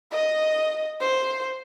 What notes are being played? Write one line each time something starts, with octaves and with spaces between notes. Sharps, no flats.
D#5
C5